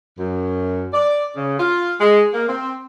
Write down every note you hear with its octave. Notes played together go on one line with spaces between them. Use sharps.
F#2
D5
C#3
F4
G#3
A#3
C4